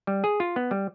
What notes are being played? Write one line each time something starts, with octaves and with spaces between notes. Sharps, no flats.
G3
G#4
F4
B3
G3